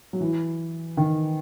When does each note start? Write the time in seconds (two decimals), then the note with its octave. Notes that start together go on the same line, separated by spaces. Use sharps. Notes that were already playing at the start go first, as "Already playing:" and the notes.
0.13 F#3
0.21 E3
0.97 D#3